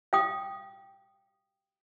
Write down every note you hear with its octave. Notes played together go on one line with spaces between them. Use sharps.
F5 G5 D#6